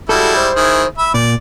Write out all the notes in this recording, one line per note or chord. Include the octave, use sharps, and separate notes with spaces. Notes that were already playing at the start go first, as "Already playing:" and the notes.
G3 G#3 E4 F#4 A4
C5
D#3 E4 G#4
E5 B5
A#2 D5